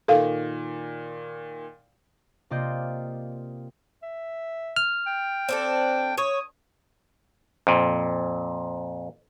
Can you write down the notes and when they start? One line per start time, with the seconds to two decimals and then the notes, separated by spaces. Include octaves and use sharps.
0.08 A#2 D#3 A4 F5
2.50 C3 A#3 F4 D5 D#5 G6
4.03 E5
4.76 F6
5.07 G5
5.49 C4 D4 A4
6.18 C#5 D#6
7.67 F2 A#2